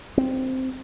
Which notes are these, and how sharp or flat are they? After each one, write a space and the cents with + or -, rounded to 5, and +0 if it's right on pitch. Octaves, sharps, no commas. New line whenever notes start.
C4 -5